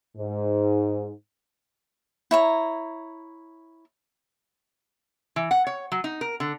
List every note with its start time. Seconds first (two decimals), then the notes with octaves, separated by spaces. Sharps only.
0.17 G#2
2.31 E4 C#5 A#5
5.36 E3
5.51 F#5
5.67 C#5
5.92 F#3
6.04 D#4
6.21 A#4
6.40 D3